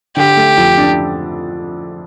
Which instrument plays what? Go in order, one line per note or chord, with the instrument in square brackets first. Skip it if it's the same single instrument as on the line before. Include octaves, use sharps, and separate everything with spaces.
[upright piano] D3 [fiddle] G4
[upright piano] A3
F2
D4